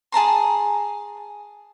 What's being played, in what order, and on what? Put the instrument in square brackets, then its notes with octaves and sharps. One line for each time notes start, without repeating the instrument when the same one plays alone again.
[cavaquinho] G#4 A5 A#5 C6